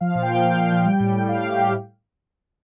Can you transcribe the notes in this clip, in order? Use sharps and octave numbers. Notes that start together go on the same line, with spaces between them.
F3 F5
A#2
G5
F3 F5
A#2 G5
F3
F3
G3
A2
G3
A2 F5
A2
G4
A2